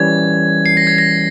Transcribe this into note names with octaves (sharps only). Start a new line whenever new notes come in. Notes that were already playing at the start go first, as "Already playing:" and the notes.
Already playing: E3 G3 C#4 G#6
C7
A#6
G#6
A#6